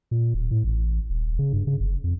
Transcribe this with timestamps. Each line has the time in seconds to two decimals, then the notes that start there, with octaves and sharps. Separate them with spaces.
0.11 A#2
0.34 D#1
0.51 A2
0.64 A1
1.10 D#1
1.39 C#3
1.53 G2
1.67 C#3
1.80 F#1
2.04 F2